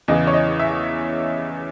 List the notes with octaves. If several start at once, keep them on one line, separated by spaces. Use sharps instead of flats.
E2 C#3 E3 D#5
C#5
D#5
E5